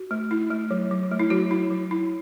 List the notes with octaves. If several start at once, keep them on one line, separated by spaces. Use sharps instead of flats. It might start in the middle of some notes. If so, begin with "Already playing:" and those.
Already playing: F#4
A3
E4
A3
F#3
F#3
A3
E4
F#3 F#4
E4
F#3
E4